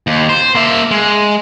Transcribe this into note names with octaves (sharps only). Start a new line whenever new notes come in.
D#2
C5
A#3 E5
G#3